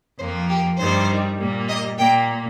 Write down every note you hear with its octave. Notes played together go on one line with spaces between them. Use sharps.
F2 F3 A#3 C5
G4
G2 D#3 G3 C5
A#2 G3 A#3
D#5
A#2 A#3 G5